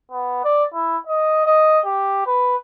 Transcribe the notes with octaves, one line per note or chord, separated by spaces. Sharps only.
B3
D5
E4
D#5
D#5
G4
B4